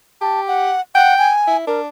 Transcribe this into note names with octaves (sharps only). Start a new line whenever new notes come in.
G4 A5
F#5
F#5 G5
G#5
E4
D4 A#4